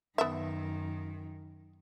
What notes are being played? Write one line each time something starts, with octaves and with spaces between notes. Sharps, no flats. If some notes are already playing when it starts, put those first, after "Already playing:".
F#2 D#3 B3 E5